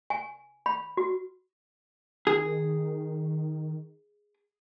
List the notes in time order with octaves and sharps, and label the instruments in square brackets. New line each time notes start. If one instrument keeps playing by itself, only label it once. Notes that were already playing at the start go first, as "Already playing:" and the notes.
[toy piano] G#5
B5
F#4
[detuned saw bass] D#3 [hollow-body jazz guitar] G#4